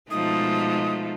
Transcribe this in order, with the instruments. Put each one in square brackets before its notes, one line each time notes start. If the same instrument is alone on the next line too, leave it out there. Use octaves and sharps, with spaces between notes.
[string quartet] B2 F3 A3 [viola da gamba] G#3 D#4 [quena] D#6